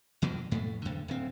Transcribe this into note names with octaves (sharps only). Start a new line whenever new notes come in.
E2 B2 F3 F#3
F2 A2 A3
E2 D3
D1 C4